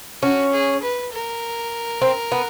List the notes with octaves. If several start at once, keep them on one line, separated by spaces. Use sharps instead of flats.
C#4 F#4
G#4
B4
A#4
C4
B3